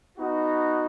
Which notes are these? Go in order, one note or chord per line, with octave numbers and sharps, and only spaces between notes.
B3 D#4 F#4